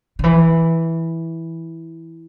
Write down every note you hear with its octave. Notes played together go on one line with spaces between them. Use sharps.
D3
E3